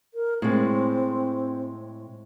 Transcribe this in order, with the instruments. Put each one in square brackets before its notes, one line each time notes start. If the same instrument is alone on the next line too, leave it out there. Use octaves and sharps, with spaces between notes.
[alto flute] A#4
[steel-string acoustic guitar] A2 G#3 [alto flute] C4